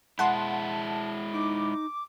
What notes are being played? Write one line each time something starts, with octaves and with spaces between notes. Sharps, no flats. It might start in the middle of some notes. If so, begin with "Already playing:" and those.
G#3 E4 F#5 A5 C6
D#4 D6